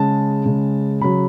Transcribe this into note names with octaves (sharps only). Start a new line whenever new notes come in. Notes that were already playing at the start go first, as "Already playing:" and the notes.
Already playing: C#3 G#3 A5
C#3 G#3
C#3 F#3 B5